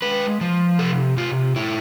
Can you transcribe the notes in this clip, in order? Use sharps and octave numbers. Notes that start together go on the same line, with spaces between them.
G#3 B4
F3
C3 A4
C3 F4
A#2 E4